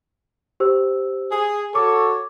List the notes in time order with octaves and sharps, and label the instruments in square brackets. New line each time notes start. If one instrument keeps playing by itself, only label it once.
[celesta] G4 C5 E6
[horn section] G#4
[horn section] F#4 A4 C#5 [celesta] D6